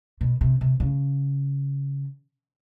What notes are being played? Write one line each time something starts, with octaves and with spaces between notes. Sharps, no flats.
B2
C3
C3
C#3